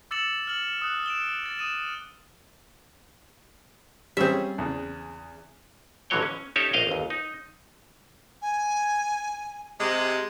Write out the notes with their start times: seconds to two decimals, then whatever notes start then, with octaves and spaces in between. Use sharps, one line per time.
0.11 D6 E6 A6 C#7 E7 F#7
0.47 F6 F#7
0.82 D#6 F#6 F#7
1.06 D7 E7 G7
1.46 A6
1.59 D#6 D#7 E7
4.17 G3 C4 C#4 G#4 E5
4.58 E2 C#3
6.10 A1 D3 E3 F#3 C#5 G5
6.22 C#4
6.56 C#4 D#4 G4 A4 C#5 E5
6.73 A#1 D#5 F5 G5
6.87 G1 D#2
7.10 D#4
8.42 G#5
9.79 C3 G#3